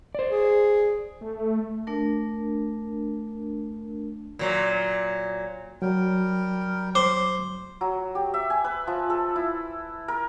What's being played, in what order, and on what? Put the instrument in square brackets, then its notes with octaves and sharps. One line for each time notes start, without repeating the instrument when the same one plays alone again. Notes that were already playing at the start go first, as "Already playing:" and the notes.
[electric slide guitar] C5 D5
[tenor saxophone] G#4
[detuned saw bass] A3
[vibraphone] A3 D4 A#4
[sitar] A#2 F#3
[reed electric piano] F#3 [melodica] G3 A#4 G5
[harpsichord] C5 [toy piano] D6
[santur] F#3
G4
E5
G#5
B4
F3
A4
E4
A#4